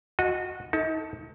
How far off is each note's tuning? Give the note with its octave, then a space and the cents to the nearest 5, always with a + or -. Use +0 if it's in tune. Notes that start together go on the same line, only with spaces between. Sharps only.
F#4 -20 D#5 +0
D#4 +35 A4 +0